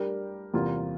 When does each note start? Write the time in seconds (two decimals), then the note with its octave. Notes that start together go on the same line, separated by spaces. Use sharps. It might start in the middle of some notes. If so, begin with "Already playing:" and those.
Already playing: G3 D4 G4 A#4
0.53 E2 C3 G3 A#3 F4